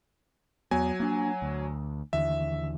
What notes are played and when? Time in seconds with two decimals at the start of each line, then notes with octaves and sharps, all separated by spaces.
0.71 E2 F#3 B3 G#5
1.00 A#3 D4
1.42 D2
2.13 D#2 D3 E3 E5